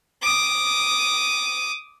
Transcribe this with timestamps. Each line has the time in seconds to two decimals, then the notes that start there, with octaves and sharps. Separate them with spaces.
0.22 D6 D#6